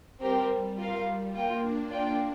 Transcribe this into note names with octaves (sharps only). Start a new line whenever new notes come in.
G3 C4 G4 A#4
G3
G3 F4 A#4 F5
A#3 F4 A#4 G5
D4
F4 D5 G5